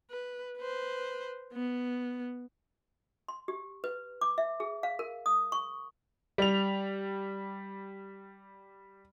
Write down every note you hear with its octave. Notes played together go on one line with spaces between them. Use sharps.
B4
B4 C5
B3
C6
G4
B4
D6
E5
G#4
F5
A#4
D#6
C#6
G3 F7